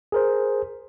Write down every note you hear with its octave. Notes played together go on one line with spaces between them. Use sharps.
G#4 A#4 C5